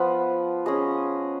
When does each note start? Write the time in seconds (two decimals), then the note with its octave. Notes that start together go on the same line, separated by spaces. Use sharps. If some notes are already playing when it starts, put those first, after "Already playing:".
Already playing: F3 B3 F4 B4
0.66 C#4 G#4 D#5